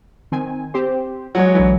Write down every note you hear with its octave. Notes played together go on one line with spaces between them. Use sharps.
D#3 C4 G#5
C4 G4 C5
F#3 G#3 C#5 F#5
B1 D3 E3